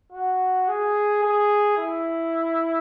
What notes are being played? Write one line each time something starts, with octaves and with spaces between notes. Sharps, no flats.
F#4
G#4
G#4
E4